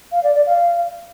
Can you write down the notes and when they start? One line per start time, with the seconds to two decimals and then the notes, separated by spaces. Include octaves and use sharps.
0.12 F5
0.23 D5
0.35 D5
0.46 F5